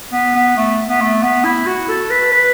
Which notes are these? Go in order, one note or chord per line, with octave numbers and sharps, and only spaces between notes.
B3
B3
A3
B3
A3
B3
E4
F#4
A4
B4
B4